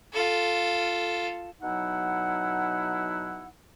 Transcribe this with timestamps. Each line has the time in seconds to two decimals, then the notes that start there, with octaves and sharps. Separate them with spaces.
0.13 F4 A4
1.61 B2 F#3 D#4 E4 F#5